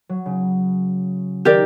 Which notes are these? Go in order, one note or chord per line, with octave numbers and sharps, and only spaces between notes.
F#3
C#3
D#3 G4 A#4 D5